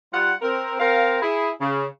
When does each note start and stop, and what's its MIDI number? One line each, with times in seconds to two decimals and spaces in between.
0.12 0.32 55
0.12 0.32 65
0.12 0.32 78
0.42 0.77 60
0.42 0.77 70
0.78 1.17 60
0.78 1.17 70
0.78 1.17 77
1.21 1.50 64
1.21 1.50 68
1.60 1.84 49